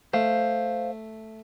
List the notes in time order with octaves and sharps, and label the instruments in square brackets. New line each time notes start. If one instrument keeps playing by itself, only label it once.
[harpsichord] A3 [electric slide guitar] C5 F5